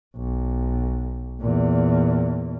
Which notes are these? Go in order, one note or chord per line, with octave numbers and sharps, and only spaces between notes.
B1
E2 A#2